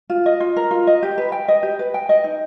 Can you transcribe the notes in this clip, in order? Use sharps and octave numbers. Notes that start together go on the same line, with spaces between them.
F4
D#5
F4
A#4
F4
D#5
G4
B4
G5
D#5
G4
B4
G5
D#5
D#4